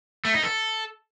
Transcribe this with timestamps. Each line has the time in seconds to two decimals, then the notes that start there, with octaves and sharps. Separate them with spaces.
0.25 A3
0.34 D#4
0.43 A4